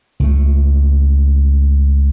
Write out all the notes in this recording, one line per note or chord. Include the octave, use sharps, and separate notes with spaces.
C#2 A3